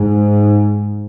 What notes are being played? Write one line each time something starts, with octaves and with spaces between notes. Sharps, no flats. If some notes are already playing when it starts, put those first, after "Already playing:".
Already playing: G#2